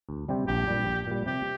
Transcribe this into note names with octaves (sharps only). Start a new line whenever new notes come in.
D2
C3 G3 C4 G4
A#1 G4
A#2 G3
A#1
A#2 G3
C3 G4